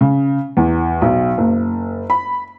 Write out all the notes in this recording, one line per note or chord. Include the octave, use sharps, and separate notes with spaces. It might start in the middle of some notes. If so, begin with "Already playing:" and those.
C#3
E2
B1
F#1
B5